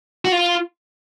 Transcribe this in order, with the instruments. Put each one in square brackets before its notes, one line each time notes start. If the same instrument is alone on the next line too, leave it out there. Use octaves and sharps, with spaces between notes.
[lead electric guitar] F#4
F4